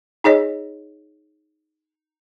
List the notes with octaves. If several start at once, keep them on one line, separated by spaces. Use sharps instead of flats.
D#4 G#4 C#5 D#5